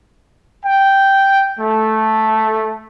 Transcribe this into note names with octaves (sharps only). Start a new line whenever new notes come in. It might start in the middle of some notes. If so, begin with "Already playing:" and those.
G5
A3